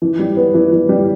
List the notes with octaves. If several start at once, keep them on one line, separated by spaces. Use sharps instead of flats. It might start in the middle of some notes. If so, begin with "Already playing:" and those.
E3
G3
B3
E3
E3
G3